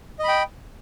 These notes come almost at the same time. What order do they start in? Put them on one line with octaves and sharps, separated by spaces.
D#5 B5 G5